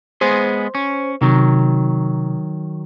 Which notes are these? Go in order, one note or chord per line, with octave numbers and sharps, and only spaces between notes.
G#3 B3 G#4 C5
C#4
C3 D#3 F#3